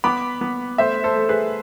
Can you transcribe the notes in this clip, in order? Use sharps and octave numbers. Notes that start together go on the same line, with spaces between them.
B3 B5 D6
B3
A3 C5 E5
A4 C5
A3
G#4 B4